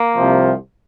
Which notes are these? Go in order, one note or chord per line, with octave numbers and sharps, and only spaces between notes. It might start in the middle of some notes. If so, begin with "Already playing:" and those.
Already playing: A#3
C2 C3 F3